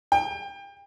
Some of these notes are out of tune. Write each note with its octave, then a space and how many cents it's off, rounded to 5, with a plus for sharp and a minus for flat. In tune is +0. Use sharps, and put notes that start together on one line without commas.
G5 +30